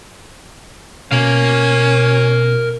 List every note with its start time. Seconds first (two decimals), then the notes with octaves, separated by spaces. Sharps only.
1.11 B2 C#4 A#4 F5